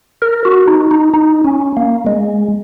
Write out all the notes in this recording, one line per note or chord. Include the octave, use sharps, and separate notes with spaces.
A#4
F#4
D#4
D#4
D#4
C#4
A#3
G#3